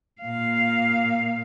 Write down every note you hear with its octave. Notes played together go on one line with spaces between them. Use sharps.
A#2 F5